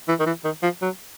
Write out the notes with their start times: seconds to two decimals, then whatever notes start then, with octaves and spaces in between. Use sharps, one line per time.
0.08 E3
0.20 D#3
0.26 E3
0.44 D#3
0.63 F3
0.82 F#3